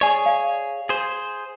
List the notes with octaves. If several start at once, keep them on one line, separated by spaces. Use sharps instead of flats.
G#4 C#5 D5 G#5
F5
G#4 C5